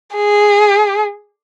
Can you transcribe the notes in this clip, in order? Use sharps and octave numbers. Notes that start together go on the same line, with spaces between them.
G#4